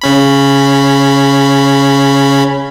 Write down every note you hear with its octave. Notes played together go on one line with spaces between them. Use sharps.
C#3 C#4 B5